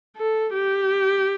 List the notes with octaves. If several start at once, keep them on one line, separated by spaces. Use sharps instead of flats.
A4
G4